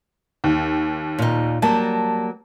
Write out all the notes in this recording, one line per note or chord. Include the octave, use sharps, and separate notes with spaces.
D#2
A#2 D#4
F#3 G3 A#3 A5